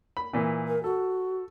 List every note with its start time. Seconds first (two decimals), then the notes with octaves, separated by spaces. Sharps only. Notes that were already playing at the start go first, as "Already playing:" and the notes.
0.17 B5
0.33 A#2 E3
0.68 A#4
0.84 F#4 A4